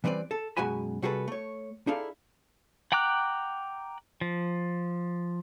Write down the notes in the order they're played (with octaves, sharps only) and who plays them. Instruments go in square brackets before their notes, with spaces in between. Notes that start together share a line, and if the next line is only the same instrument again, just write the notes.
[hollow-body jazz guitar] E3 G3 C4 B4 D5
A4
F#2 B2 G#3 F#4 G#5 B5
C3 G3 F#4 G#4 A4 B4
A3 C#5
D#4 E4 G#4 A4 D5 F5
[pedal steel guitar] F#5 G5 A#5 D6 F#6
F3